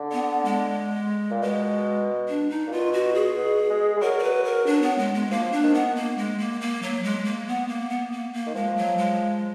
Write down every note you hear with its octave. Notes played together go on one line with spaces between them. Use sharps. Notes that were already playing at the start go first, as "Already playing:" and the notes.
Already playing: D3
B3
G#3
A#2
B2 G#3
D4
D#4
A#2
B2 F4
F#4
G#4
B2
G#3
G#3
F#3 A#4
D5
B4
A#4
D4
B3
G#3
G#3
F3 A#3
D4
D#3
B3
A#3
G#3
A#3
A#3
F#3
G#3
A#3
B3
A#3
B3
A#3
A#3
D#3
F3 G#3
F#3
G#3